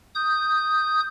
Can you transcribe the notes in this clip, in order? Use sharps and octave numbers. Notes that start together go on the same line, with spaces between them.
D#6 G6